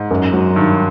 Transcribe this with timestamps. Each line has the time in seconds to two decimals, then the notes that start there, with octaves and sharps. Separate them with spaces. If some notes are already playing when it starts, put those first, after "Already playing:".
Already playing: G#2
0.11 F#2
0.33 F#3
0.56 G2 D#3